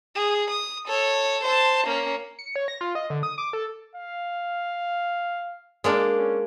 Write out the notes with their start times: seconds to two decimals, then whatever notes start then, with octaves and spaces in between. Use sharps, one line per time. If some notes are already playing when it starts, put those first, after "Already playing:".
0.15 G#4
0.50 D#6
0.87 A4 C#5
1.44 C5 A5
1.87 A#3 C#4
2.39 C#7
2.56 C#5
2.68 A#6
2.81 F4
2.95 D#5
3.10 D3
3.23 D#6
3.38 D6
3.53 A4
3.95 F5
5.84 G#3 A#3 D4
6.17 C#4